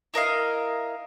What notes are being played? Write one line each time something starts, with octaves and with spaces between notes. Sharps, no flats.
E4 A#4 D#5 F5